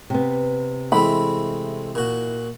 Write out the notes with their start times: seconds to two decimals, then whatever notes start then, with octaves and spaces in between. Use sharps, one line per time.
0.10 C3 B3
0.92 E3 G#3 A3 C4 E4 B5
1.95 A#2 F#4